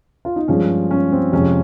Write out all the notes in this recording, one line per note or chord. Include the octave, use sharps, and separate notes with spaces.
F4
D#4
G2 F3 G#3 C#4
C#4
C4
F2 C3 F3 G#3 C#4